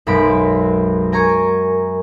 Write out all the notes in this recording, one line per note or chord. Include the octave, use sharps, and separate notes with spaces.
B1 F#2 G#3 B5 B6 D7
A#4 G#5 A#5 C#6 G#6